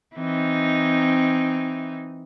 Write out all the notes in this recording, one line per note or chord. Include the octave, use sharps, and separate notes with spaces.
E3 C4 D#4